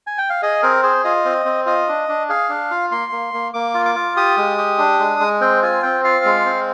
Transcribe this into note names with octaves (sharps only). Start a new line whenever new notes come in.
G#5
G5
F5
G#4 D#5
C4 A#4
G#4 C5
F4 D#5
C4
C4
F4 D#5
D4
D4
G#4 F5
D4
F4
A#3 C6
A#3
A#3
A#3 D6
F4
D6
F4
G4 D#6
G#3
G4
D4
G#3
G#3
C4 G5
F4 G#5
C4 G5
F4 F5
G#3
C4